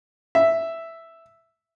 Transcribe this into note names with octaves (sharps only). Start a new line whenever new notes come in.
E5